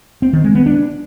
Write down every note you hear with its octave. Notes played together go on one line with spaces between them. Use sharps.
C4
D#3
G#3
B3
D4